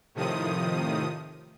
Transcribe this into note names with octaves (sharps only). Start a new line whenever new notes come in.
A2 C3 D#3 F3 D#6